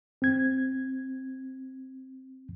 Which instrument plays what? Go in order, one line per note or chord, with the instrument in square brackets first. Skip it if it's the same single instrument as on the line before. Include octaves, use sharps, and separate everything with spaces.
[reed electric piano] C4 G#6